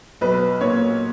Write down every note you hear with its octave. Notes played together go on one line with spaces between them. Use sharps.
B1 B4
A#2 C#5